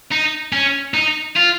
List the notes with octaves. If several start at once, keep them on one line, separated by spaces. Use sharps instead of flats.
D#4
C#4
D#4
F4